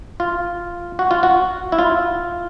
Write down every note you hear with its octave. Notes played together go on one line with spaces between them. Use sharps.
F4
F#4
F4
F#4
E4
F4